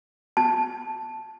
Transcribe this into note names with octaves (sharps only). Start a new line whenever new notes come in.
A5